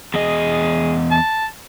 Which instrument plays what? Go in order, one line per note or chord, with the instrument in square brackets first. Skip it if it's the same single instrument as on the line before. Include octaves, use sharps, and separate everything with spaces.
[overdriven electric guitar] E2 D#5 [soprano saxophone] G#4
[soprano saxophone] A5